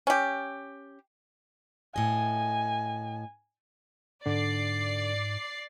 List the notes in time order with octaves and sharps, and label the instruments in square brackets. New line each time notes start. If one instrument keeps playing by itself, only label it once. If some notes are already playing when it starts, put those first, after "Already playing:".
[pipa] C#4 G4
[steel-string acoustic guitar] A2 D#5 [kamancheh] G#5
[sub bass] G#2 [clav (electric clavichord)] D3 [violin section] D5 C7